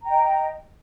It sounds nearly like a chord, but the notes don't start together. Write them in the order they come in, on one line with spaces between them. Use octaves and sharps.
A#5 G5 D#5